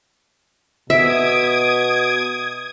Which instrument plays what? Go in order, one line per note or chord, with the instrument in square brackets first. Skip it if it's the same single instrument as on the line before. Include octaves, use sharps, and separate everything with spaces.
[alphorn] B2 [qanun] E5 [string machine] D#6 G#6 [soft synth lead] D7